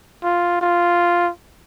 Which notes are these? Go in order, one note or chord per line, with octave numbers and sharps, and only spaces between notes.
F4
F4